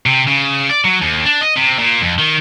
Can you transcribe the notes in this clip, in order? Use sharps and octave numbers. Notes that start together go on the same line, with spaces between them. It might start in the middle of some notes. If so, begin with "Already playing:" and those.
C3
C#3
D5
F#3
D#2
D4
D#5
C3
A#2
F2
D#3